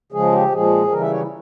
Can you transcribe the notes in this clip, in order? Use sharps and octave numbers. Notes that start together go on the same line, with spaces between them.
C#3 F3 G#3 G#4
G4
A#2 F3 G#3 G#4
C#3 E3 G3 A#4
E5
C#5
E4